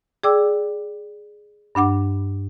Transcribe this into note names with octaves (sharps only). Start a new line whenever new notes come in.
G#4 D5 G5 D6 E6
G2 D4 F#5 D6